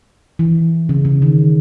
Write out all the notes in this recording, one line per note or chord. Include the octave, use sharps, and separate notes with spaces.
E3
C#3
C#3
D#3